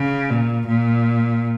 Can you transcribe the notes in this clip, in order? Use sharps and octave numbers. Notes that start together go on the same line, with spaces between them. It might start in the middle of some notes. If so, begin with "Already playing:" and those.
Already playing: C#3
A#2
A#2